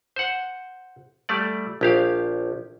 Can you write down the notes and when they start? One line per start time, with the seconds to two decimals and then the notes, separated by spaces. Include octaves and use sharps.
0.16 C5 F#5
1.29 G3 A3 D5
1.81 A#1 G4 F5